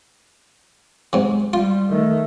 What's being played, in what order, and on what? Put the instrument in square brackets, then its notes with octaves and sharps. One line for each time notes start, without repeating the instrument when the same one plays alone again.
[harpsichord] G#2 C3
[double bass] G3 [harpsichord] F4
[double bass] D#3 A3